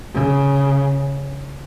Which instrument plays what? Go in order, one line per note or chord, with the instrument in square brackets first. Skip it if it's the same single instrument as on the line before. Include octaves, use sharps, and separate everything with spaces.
[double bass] C#3